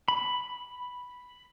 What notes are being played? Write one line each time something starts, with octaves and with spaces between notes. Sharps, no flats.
B5